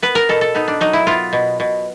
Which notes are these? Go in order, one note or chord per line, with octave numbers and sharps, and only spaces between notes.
B3 B4
A#4
B2 A4
A4
B3 D#4
D4
F#3 D#4
E4
B3 F4
B2
B2